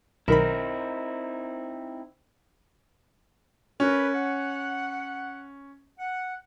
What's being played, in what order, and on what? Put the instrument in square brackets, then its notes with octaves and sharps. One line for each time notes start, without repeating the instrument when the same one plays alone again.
[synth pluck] B1 D#3 B5 [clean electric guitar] C4 D#4 E4 [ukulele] A#4
[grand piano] C#4 [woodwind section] A#4 B4
[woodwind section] F#5
F#5